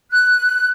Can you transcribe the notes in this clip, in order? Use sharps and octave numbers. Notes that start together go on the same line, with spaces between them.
F#6